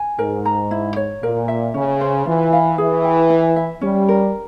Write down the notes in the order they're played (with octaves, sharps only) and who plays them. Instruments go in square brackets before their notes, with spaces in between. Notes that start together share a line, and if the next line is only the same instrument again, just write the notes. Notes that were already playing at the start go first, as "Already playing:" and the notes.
Already playing: [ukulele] G#5
[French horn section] G#2 [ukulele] A#4
[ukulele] A#5
E4
C#5
[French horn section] A#2 [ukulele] A#4
[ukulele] E5
[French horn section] C#3 [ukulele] C#4
[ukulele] C5
[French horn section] E3 [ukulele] F4
[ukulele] F5
[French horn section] E3 [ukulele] G#4
[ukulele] G5
E4
E5
[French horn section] G3 [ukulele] C#4
[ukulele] A#4